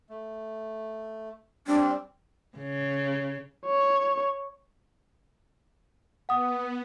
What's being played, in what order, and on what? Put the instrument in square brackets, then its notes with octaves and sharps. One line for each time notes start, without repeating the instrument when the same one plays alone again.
[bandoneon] A3
[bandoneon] G3 C4 [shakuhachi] D4
[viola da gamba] C#3
[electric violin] C#5
[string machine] B3 [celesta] F#5 D#6